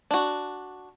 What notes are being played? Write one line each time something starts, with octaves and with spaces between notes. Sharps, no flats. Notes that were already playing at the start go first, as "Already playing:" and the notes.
D4 F#4